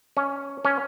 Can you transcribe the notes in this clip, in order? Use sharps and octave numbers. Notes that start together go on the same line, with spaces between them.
C#4
C#4